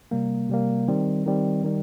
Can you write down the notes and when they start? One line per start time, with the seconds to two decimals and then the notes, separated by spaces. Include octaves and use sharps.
0.11 C3 G3 A#3
0.49 C3 G3 A#3
0.88 D#3 G3 C4
1.26 D#3 G3 C4
1.64 D#3 G3